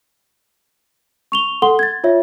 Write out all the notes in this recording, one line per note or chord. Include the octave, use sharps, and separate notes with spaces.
C#6 F7 G7
A4 F#5 C6 G7
G#6 A6
F4 C#5 E5